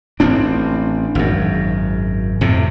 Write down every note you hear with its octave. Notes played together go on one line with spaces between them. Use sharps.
A1 C4 D4
G#1 F#2
F2 A2 C3